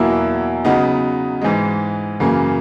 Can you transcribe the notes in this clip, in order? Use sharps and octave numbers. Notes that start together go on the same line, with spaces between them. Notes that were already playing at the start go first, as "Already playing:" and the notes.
Already playing: E2 B2 F#3 A#3 E4
C#3 F#3 B3 D#4
G#2 E3 G#3
F#2 C#3 E3 A#3